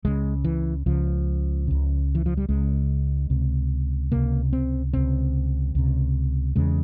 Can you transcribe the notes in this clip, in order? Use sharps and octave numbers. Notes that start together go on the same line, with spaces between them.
C#2 C#3 G#3
E3
C#2 C#3 F3
C#2 C#3
E3
F3
G3
C#2 C#3 G#3
C#2 C3
C#2 C3 A#3
C4
C#2 C3 C4
C#2 C3
E2 C#3 G#3